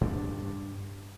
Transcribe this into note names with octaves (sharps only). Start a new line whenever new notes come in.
G2 D4